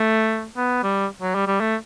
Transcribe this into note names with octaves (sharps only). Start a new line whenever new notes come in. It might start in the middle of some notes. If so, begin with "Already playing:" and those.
Already playing: A3
B3
G3
F#3
G3
G3
A3